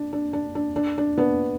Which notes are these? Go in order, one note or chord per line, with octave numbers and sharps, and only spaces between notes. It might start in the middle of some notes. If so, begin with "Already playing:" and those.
Already playing: D4
D4
D4
D4
D4
D4
B3 D4